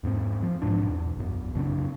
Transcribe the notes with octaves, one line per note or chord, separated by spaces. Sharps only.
E2 G#2 A#3 C4
F3
B1 G#2 B2 D4
E2
B1 F#2
F#2 C#3 C4 D4